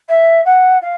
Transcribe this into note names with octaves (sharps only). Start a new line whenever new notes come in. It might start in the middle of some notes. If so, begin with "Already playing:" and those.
E5
F#5
F5